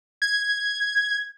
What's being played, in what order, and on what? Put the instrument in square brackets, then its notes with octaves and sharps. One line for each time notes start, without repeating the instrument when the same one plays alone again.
[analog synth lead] G#6